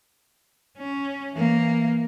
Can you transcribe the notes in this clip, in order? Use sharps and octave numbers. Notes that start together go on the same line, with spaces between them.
C#4
E3 A#3